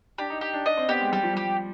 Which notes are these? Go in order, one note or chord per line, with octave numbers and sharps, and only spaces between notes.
D4 G4
D#4
G4
D4
D4 D#5
C4
B3 G4
G#3
G3 G4
F3
G3 G4